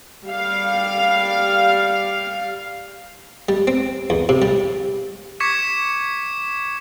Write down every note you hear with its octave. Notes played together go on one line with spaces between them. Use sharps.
G3 F5
G3
C4
E2
C3
G3
C#6 D6 G#6 B6 C#7 E7